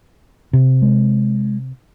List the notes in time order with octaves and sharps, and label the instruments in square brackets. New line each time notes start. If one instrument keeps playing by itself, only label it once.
[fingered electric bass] C3
[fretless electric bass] G#3